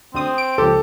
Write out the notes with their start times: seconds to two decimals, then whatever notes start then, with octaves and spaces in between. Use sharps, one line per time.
0.14 D2 C4 D#6
0.38 D7
0.58 C#2 F3 G4 A4